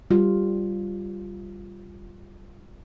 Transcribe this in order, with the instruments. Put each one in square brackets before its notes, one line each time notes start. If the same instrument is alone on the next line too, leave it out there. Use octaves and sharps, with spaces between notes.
[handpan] G3 F4